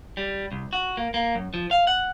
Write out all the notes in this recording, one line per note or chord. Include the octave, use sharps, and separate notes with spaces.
G3
C2
F#4
A#3
A#3
F#2
F3
F5
F#5